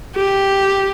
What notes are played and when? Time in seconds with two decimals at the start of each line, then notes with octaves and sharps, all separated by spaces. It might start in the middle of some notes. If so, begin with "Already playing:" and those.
0.16 G4